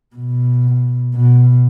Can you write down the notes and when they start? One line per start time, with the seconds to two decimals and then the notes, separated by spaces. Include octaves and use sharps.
0.16 B2
1.15 B2